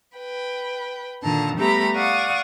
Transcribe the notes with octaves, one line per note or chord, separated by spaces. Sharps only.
B4 G5
A#2 D3 D#3 A5 A#5
G3 A3 B3 G4 A#5 B5
D5 F5 F#5 C#6 D#6